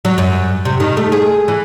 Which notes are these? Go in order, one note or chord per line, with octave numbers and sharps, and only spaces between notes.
F#3
F#2
C3
D#3
A3
G#4
E3